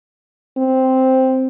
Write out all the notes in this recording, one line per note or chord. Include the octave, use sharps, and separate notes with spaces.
C4